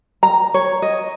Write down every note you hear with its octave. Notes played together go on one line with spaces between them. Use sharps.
A#5
C#5
D#5